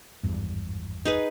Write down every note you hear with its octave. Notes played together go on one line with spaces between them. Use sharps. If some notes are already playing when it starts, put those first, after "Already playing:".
G#1 E2 G2
D#4 G#4 B4